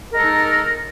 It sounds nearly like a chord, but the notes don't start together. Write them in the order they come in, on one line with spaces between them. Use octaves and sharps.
A#4 G#3 A4 D#4